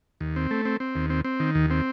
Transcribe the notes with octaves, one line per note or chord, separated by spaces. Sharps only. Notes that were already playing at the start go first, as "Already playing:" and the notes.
D#2
C4
A3
C4
C4
D#2
C4
C4
D#3
D#2
C4